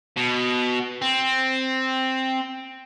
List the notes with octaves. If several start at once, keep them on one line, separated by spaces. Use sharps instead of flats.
B2
C4